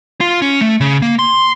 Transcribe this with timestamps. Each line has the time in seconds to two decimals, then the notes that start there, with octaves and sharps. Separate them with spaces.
0.21 F4
0.42 C#4
0.61 A3
0.81 C#3
1.02 A#3
1.19 C6